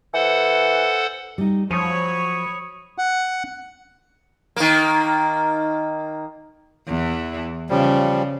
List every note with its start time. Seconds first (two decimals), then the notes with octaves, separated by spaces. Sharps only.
0.14 E3 A4 C5 F#5
1.38 G3 D#4
1.71 F3 F#3 C#5 G#5 B5 D#6 C#7 D#7
2.98 F#5
4.56 D#3 A#3
6.88 E2 E3
7.69 C#3 F3 G3